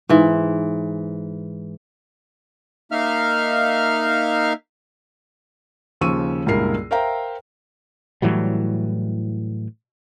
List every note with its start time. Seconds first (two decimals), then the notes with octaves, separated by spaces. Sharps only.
0.09 G#2 E3
2.92 A#3 D#4 E5 F5 F6
6.01 D#2 C#3 F3 C#6 E6 D#7
6.46 C#2 G2 A#2 E4 A#4 C7
6.91 A#4 C5 E5 F5 G5 A#5
8.22 A2 E3 F#3 G3